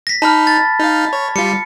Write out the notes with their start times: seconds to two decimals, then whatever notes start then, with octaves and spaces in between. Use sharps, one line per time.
0.07 A#6 B6
0.22 D#4 A5 B5 F6
0.47 A6
0.80 D#4 F5
1.13 C#5
1.36 G3 F4 C#7